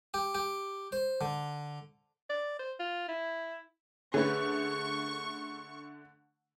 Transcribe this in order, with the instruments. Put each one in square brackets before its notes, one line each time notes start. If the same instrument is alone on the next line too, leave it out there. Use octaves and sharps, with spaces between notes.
[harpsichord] G4
G4
C5
D3
[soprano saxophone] D5
C5
F4
E4
[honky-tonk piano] D3 A3 [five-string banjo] C#4 B4 [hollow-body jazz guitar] G#4 [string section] C#6